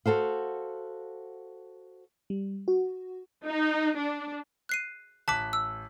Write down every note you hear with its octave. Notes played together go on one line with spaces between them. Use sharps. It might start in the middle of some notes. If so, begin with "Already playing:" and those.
F#4 A4 C5 F5
G3
F#4
D#4
D4
F#6 C7 D#7
A1 A5 D6 F#6 B6
E6